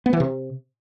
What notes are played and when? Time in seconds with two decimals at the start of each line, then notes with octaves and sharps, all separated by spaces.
0.06 B3
0.13 E3
0.20 C3